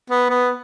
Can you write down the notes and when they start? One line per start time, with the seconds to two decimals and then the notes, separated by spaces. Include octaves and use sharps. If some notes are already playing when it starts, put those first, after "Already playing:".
0.10 B3
0.30 B3